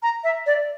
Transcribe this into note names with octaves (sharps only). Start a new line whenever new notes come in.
A#5
E5
D5